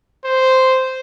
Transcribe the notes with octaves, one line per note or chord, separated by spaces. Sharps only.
C5